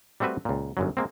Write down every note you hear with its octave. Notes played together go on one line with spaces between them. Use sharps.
G3 A3 C4 F#4 B4 E5
C#2 A#2
G1 F#2 F#3
G#3 A#3 C4